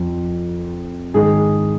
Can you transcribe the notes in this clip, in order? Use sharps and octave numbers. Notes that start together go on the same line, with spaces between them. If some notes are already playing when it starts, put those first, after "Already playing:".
Already playing: F2 F3
G#2 D#3 G#4